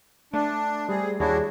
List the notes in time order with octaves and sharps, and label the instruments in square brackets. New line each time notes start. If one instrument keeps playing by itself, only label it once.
[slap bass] A3 [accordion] D4
[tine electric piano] G3 [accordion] C4 G#4
[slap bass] D#2 [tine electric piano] G3 G#4 C#5 [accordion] D4 E4 F#4